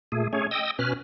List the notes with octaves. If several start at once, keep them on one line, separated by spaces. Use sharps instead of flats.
A#2 A3 G#4
A3 C#4 G#4 C#5
D#5 G5 D#6 E6
B2 C#4 B4 F6